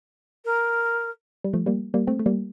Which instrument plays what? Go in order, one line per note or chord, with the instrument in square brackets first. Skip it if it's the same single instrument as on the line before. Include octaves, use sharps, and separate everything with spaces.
[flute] A#4
[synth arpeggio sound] G3
F3 A3
G3 A#3
G3 A#3
A3 C4
A3
G3 A#3